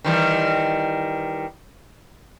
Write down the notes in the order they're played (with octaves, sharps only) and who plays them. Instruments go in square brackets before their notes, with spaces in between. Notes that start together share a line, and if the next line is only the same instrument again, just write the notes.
[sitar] D#3 E3 G3